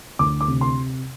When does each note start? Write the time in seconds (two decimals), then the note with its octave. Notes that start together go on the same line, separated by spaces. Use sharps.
0.19 D2 D6
0.41 D6
0.48 C3
0.61 C6